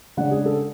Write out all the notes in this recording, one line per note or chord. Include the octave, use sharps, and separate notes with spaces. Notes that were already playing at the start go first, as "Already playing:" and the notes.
C#3 G#3 D4 F#5
G#4
A4